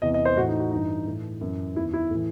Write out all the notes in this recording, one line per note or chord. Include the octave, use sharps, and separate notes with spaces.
E2 C3 E3 D#5
D#5
C5
A2 F#4
E3
D#4
F#4
G2 E3 D#4
A2 E3
F#2 E3
E2 D#3 E4
E4
A2 E3